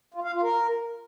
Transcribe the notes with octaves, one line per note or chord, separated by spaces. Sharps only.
F4
F5
F4
A#4